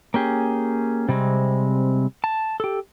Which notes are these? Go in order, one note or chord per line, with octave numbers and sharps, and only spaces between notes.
A#3 C#4 G4 G#4
C3 G3 G#3 C4
A5
G4 A4